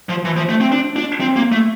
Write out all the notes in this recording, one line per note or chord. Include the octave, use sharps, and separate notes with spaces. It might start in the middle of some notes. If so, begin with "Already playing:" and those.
F3
E3
F3
A3
C4
D4
D4
C4
A#3
A3